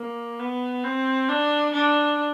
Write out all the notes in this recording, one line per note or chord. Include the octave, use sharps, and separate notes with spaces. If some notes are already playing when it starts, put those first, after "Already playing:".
Already playing: A#3
B3
C4
D4
D4